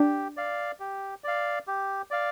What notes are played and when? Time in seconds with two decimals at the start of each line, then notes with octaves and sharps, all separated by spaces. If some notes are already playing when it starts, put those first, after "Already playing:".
Already playing: D4 G4
0.37 D5 F5
0.80 G4
1.24 D5 F5
1.67 G4
2.11 D5 F5